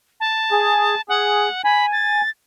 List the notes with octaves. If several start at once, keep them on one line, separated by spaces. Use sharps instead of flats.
A5
G#4
G#4 F#5
G#5 B5
A6